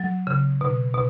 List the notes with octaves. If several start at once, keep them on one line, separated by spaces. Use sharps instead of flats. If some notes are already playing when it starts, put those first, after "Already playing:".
Already playing: F#3
C#3
B2
B2